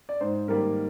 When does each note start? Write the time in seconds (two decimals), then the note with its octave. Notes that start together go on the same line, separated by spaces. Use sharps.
0.09 D5
0.21 G#2 C5
0.48 D#3 G3 A#3 A#4